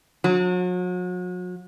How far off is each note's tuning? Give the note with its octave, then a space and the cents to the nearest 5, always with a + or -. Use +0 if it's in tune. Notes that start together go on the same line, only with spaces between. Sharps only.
F#3 -40